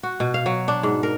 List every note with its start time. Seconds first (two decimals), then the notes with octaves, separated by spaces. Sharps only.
0.03 F#4
0.20 B2
0.34 F5
0.46 F#3
0.68 D4
0.83 G#2
1.03 A#4